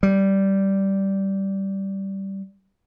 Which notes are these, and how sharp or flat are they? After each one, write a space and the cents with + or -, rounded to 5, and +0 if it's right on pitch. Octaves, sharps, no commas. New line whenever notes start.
G3 -10